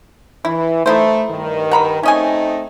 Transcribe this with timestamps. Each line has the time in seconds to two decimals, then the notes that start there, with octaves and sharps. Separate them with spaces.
0.45 E3 E4
0.86 A3 D#4 E4 C5
1.30 G2 D#3
1.72 F#5 A#5 B5
2.03 A3 C4 C#4 D#4 D#5 G#5